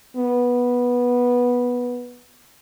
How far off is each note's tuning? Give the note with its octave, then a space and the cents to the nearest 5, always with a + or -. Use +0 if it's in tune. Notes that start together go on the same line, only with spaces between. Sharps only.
B3 -10